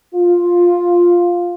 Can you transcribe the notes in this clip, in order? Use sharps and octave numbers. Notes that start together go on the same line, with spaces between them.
F4